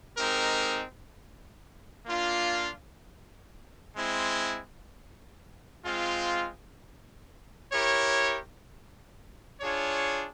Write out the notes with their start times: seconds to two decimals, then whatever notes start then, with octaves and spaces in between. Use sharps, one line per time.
0.17 G#3 C4 D#4 G4 A#4
2.06 A#3 D4 F4
3.94 G#3 C4 E4
5.83 G#3 C4 F4
7.72 E4 G4 A#4 C#5
9.61 D4 F4 G#4 C#5